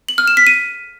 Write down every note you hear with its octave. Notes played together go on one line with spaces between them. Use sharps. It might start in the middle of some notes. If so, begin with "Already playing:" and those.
F#7
F6
E7
B6
D#7